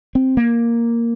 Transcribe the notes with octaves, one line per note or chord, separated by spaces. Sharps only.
C4
A#3